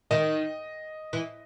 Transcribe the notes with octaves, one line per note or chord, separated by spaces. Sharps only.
D#3 D#5
E3